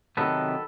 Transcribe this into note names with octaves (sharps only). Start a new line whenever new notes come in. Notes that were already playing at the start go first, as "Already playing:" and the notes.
C3 D#3 F#3 B3 A4 B4